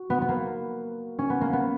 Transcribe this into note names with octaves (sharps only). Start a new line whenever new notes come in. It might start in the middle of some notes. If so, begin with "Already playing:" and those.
Already playing: F#4
B3
B3
A#3
C#4
B3
A#3
B3